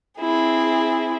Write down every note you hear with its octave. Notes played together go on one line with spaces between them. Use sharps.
C4 E4 G#4